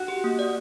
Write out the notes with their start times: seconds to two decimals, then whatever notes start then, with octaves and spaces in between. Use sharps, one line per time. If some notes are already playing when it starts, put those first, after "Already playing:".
Already playing: F#4
0.08 G4
0.24 A#3
0.39 D5